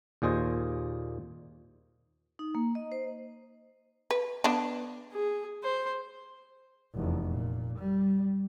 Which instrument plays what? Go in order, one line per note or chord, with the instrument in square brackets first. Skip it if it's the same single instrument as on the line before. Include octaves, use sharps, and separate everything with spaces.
[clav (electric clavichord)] D#2 A#2 G#4 C5 D#5
[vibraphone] D#4
A#3
D#5
C5
[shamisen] B4
B3 D4
[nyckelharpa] G#4
C5
[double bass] F1 E2
A#2
G3